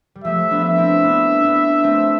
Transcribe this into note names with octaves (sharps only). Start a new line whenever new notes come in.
G3
F3 A3 E5
B3 D4
E5
C4 E4
B3 D4
B3 D4
A3 C4